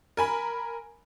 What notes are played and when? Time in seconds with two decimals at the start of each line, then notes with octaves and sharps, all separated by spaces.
0.17 A#4 G#5 B5